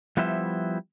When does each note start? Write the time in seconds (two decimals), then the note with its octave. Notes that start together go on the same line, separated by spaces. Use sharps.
0.17 F3 G3 B3 E4 C5 E5